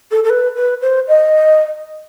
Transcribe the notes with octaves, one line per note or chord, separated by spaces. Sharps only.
A4
A4
B4
B4
C5
D#5